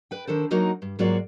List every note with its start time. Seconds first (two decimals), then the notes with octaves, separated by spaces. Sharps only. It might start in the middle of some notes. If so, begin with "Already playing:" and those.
0.11 B4 G5
0.27 D#3 D4 A4 C5
0.51 F#3 A#3 D#4 F#4 A#4 D#5
0.82 G2
0.99 G#2 F#3 A#3 F4 F#4 D5